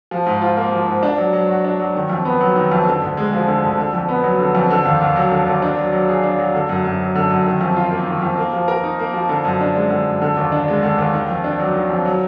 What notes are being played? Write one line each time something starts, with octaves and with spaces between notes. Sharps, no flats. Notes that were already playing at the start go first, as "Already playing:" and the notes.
F3
G#2
F4
A#3
F3
G#2
D4
F#3
F#3
F#4
D4
F#3
D#3
F2
B3
F#3
D#3
F2
D3
D2
G#3
F3
D3
D2
D3
F2
B3
F#3
D3
F2
D3
D#2
D#2
F#3
D3
D#2
D4
F#3
F#3
G#4
D4
F#3
D3
F#2
F#2
F#3
D3
F#2
D#3
F2
F4
A#3
D#3
F2
A#3
F3
A#4
D#4
A#3
F3
D3
F#2
D4
G#3
D3
F#2
D3
D#2
D4
G#3
D3
D#2
D#3
F2
D4
F#3
D#3
F2
F#3